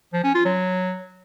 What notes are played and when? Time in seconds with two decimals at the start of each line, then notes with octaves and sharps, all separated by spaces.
0.13 F3
0.24 C#4
0.35 F4
0.45 F#3